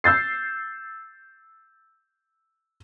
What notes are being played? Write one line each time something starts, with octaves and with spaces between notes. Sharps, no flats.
E6 G6 A6 C7